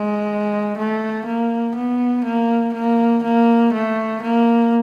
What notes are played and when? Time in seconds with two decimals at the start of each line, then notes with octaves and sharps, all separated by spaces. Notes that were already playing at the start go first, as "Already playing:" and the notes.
Already playing: G#3
0.77 A3
1.26 A#3
1.75 B3
2.24 A#3
2.74 A#3
3.23 A#3
3.73 A3
4.22 A#3